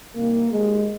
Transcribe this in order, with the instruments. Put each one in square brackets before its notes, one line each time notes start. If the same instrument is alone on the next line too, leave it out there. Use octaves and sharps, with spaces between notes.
[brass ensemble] C2 C3 D#3 A#3
D#2 D#3 G#3